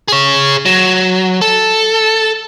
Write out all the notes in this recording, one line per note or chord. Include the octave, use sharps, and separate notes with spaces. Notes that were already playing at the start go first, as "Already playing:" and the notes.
G#4 C#5
F#3
A4